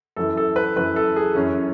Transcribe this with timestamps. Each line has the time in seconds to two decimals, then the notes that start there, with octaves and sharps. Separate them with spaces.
0.16 F#2 E3 A4
0.37 A4
0.56 B4
0.76 F#2 E3 B4
0.96 A4
1.16 G#4
1.35 F#2 E3 C#4